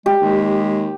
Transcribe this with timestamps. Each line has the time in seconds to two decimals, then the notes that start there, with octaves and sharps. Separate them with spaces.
0.06 G#3 G4
0.21 D#2 G#3